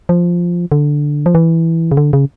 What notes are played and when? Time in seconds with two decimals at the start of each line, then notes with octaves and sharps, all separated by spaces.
0.09 F3
0.72 D3
1.26 F3
1.35 E3
1.92 C#3
1.97 D3
2.13 C#3